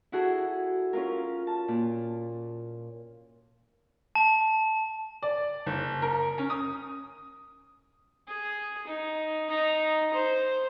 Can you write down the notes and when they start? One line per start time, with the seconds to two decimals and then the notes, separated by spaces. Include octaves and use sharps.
0.12 E4 F#4 G#4 A4
0.93 C#4 F4 A#4
1.47 A5
1.68 A#2
4.15 A5
5.23 D5
5.66 F#1
6.02 A#4
6.38 C#4
6.50 D#6
8.28 G#4
8.87 D#4
9.49 D#4 A#5
10.13 C5